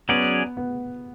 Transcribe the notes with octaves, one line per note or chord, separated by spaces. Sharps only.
F#3 B3 C#4 G#4 D5
B3